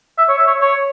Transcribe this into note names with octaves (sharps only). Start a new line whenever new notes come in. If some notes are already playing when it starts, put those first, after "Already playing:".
E5
C#5
E5
C#5
C#5